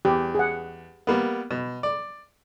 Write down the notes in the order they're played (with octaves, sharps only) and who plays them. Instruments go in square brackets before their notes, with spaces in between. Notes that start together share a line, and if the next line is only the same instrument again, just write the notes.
[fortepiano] E2 [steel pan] G4
[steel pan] G#4 F#5
[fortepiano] G3 A#3 B3
B2
D5